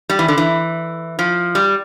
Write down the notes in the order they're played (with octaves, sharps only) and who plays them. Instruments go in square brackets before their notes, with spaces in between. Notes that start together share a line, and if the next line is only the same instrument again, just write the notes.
[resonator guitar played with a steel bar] G3
E3
D3
E3
F3
G3